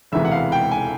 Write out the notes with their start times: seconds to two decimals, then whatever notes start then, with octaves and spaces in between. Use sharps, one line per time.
0.12 E1 D2 C3 E3 G#3 E5
0.25 F#5
0.32 F5
0.52 G5
0.71 G#5